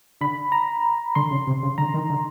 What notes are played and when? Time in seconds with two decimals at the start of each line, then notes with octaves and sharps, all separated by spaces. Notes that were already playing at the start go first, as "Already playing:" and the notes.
0.21 D3 B5
0.52 A#5
1.15 D3 C6
1.31 C#3
1.47 C3
1.63 C#3
1.78 D3 A#5
1.94 D#3
2.10 D3